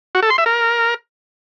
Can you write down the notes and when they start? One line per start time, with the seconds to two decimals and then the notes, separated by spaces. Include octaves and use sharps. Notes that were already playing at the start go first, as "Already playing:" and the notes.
0.15 F#4
0.23 A4
0.30 C6
0.38 E5
0.46 A#4